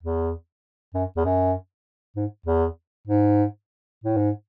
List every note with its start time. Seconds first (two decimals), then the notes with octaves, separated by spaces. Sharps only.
0.03 E2
0.94 F#2
1.17 E2
1.25 F#2
2.16 G#2
2.46 E2
3.07 G#2
4.04 A2
4.17 G#2